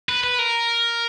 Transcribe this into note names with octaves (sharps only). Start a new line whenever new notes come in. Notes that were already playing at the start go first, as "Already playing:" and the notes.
B4
B4
A#4